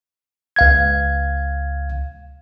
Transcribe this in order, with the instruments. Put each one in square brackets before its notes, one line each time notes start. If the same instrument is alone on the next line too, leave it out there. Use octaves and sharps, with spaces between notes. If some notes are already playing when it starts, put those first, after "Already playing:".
[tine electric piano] C#2 F5 G#6